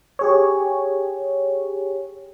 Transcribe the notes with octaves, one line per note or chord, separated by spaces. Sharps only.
G4 G#4 C#5